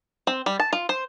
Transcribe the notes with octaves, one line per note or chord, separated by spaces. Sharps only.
C4
G3
A5
F4
C5